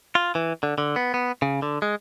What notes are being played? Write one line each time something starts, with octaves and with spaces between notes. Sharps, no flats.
F4
E3
D3
D3
B3
B3
C#3
D3
G#3